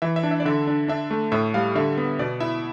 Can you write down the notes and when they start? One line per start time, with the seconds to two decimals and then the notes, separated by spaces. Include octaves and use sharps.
0.02 E3 E5
0.16 E5
0.23 D4
0.31 E5
0.40 D5
0.45 D3 E5
0.67 D4
0.88 D4 E5
1.11 A3
1.32 A2 E5
1.54 G3 F5
1.75 D3 E5
1.97 B3
2.19 B2 D5
2.40 E4 E5